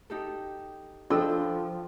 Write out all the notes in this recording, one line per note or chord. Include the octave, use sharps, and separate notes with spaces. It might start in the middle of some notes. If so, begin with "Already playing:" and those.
D#4 G4 A4
F3 D4 F4 A4 G5 E6